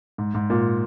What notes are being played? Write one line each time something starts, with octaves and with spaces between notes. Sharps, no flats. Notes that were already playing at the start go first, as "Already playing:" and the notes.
G#2
G#2
A#2